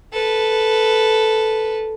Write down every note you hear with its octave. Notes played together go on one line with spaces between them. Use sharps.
A4 B4